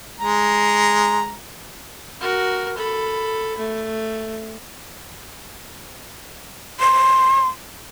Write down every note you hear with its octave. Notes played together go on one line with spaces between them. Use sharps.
G#3 A#5
F#4 A#4
A4 B5
A3
C6